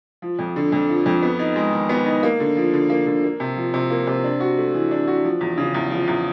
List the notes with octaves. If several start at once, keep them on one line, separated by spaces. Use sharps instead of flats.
F3
F2
D3
F2
F3
F2
B3
D#4
G#3
D#3
B3
D#4
A#3
D3
F3
D3
A#3
D3
A#3
C3
F3
C3
A#3
C3
D4
F#4
A3
E3
D4
F#4
F3
E2
C#3
E2
F3
E2